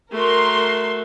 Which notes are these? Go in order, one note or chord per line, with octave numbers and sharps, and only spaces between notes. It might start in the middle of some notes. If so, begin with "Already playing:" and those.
A3 F#4 A#4 C6